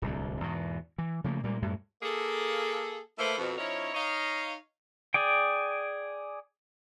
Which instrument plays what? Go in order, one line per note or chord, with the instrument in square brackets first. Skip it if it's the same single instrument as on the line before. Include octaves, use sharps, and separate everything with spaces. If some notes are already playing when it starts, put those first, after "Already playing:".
[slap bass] D1 C2 D3
E2 G#2 B2
E3
C#3 F3 A3 A#3
A#2 G3 G#3 A#3
F#2 A2 G3 G#3
[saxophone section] A#3 G#4 A4
A3 A#3 E4 A4 B4 C5
F2 B2
F3 C#4 D#4 E4 C#5
D#4 C#5 D#5 F5
[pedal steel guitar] G#4 D5 G5